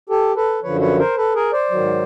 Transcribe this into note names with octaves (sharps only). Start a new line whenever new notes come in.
G4 A4
A4 B4
F#2 D3 F3 B4 C#5
B4 C#5
A#4 C5
A4 B4
G#4 A#4
C5 D5
G#2 D#3 F#3